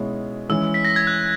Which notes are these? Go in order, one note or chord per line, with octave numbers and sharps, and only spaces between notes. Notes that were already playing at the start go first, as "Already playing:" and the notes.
Already playing: B2 G#3 C#4 E4
E3 G#3 C#4 G#4 E6
B6
A#6
G#6
F#6